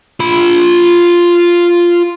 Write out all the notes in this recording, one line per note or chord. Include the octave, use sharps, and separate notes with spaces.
F4 B5